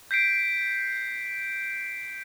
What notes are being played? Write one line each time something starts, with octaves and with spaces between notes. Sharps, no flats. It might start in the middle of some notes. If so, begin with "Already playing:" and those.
G6 B6 C7 D7